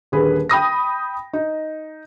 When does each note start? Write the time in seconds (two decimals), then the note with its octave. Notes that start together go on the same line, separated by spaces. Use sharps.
0.12 D#1 D3 G#4 B4
0.49 G5 B5 D#6 A#6
1.33 D#4